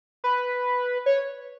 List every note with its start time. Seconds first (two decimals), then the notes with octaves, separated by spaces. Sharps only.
0.24 B4
1.06 C#5